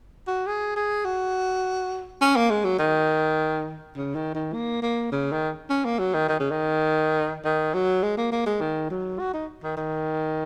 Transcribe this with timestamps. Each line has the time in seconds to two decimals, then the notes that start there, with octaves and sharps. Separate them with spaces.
0.27 F#4
0.47 G#4
0.76 G#4
1.05 F#4
2.21 C#4
2.36 A#3
2.50 G#3
2.65 F#3
2.79 D#3
3.96 C#3
4.15 D#3
4.35 D#3
4.53 A#3
4.83 A#3
5.12 C#3
5.32 D#3
5.70 C#4
5.85 A#3
5.99 F#3
6.14 D#3
6.29 D#3
6.40 C#3
6.51 D#3
7.45 D#3
7.74 F#3
8.03 G#3
8.17 A#3
8.32 A#3
8.46 G#3
8.61 D#3
8.90 F#3
9.20 F#4
9.34 D#4
9.63 D#3
9.77 D#3